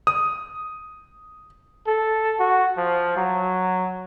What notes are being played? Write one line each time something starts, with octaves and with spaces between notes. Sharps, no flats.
D#6
A4
F#4
F3
F#3